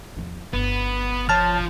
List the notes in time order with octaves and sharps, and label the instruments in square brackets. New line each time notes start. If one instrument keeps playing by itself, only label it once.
[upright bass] E2 F3
[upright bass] G1 [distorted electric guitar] B3
[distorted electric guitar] F3 [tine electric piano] C#5 A5 F6